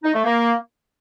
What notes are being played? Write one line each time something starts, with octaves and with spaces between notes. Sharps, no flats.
D#4
A3
A#3